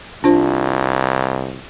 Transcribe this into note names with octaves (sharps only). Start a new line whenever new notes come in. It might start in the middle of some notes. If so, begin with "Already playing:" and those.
C2 D4 F4 C5